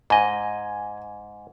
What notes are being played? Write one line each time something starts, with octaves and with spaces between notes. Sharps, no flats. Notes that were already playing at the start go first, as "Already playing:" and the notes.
G#2 D#5 G#5